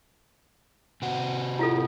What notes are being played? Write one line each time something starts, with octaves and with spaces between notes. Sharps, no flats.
C3 C4 F#4
E4 F4 A4